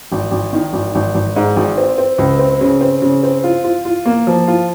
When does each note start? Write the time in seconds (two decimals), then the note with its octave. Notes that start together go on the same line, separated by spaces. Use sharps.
0.12 G#1
0.31 G#1
0.53 D#3
0.73 G#1
0.95 G#1
1.14 G#1
1.36 G#2
1.56 G#1
1.78 C4
1.98 C4
2.18 C#2
2.39 C4
2.61 C#3
2.81 C4
3.02 C#3
3.23 C4
3.44 F4
3.64 F4
3.85 F4
4.06 A#3
4.27 F3
4.47 F4